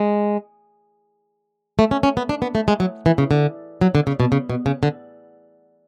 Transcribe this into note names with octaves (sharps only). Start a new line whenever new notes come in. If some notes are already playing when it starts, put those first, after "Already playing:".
Already playing: G#3
A3
C#4
C#4
B3
D4
B3
A3
G#3
F#3
E3
C#3
D3
F#3
D3
C#3
B2
C#3
B2
C#3
D3